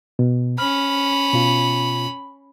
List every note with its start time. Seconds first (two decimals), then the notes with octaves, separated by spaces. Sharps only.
0.19 B2
0.58 C#4 B5 F6
1.33 B2 F4